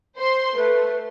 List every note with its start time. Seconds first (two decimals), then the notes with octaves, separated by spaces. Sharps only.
0.16 C5 C6
0.55 A3 B4